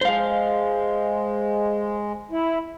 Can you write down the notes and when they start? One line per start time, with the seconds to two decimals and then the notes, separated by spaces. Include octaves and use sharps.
0.01 G#3 C5 F5
2.31 E4